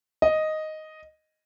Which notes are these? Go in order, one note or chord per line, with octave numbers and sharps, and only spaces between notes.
D#5